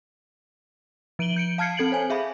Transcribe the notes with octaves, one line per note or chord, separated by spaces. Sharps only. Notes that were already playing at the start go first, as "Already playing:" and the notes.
F3 D7 D#7 F#7 G7
G6 C#7 D7
F5 A5 F6 G#6 C7 C#7
C4 A4 G#6 D7 F#7
C5 C#5 G#5
G#4 E5 F5 B5